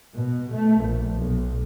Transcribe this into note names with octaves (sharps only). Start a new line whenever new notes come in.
B2
A3
A#1
B1